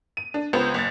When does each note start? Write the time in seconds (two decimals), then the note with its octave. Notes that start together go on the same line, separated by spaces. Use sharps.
0.17 D#7
0.34 D4
0.53 C#2 B3 C5
0.74 F#1 A6